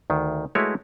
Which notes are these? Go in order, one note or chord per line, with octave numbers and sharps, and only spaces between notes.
D2 D#3
G#3 A3 E4 F#4 B4 C#5